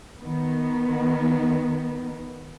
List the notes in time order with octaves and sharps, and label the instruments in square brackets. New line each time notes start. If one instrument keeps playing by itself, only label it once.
[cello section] D#3 B3